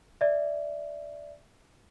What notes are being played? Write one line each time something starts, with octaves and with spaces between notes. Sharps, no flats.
D5 E5